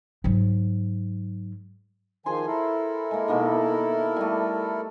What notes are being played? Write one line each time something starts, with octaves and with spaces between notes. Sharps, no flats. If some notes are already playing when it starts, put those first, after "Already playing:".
G#2 F#3
D#3 F3 G#4 C5 G#5 C6
E4 A4 A#4
G#3 A#3
B2 D#3 A#3
G3 A3